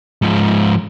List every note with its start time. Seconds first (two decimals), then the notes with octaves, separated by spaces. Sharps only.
0.22 G#2 F3